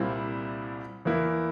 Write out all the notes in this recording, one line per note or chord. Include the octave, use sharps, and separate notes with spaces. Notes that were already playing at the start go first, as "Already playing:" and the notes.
Already playing: C2 A#2 G3 C4 E4
E2 E3 A#3 E4